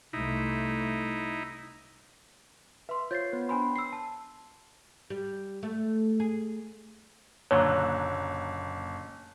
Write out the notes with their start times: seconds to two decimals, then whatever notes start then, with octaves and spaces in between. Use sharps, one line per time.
0.13 C2 A3 D#4 E4
2.89 B4 E5 C6
3.11 F4 C5 C#5 G6 A6 C7
3.32 B3 B4
3.49 D4 G#5 B5 C6
3.76 E6 C7
3.93 A5
5.10 G3
5.63 A3
6.20 G#4
7.51 F#1 A#2 D3 F#3 C#5